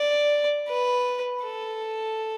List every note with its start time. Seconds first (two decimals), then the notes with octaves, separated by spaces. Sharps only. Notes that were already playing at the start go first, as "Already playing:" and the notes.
Already playing: D5
0.68 B4
1.44 A4